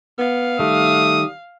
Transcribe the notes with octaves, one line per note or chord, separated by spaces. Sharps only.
B3 F5
D#3 G3 A3 D#6